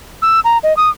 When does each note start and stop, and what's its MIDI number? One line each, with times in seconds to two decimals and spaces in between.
0.22 0.40 88
0.44 0.58 82
0.63 0.76 75
0.77 0.89 87